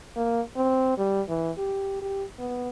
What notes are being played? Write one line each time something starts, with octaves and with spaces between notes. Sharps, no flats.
A#3
C4
G3
E3
G4
G4
B3